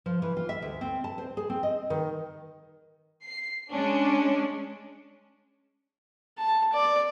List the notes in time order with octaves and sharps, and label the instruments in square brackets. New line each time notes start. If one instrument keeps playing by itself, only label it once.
[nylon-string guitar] F3
E3
F4
E5
D2
C4
A5
C5
G#4
C4
D#5
D#3
[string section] C7
G#3 C#4 D4
[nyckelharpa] A5
D5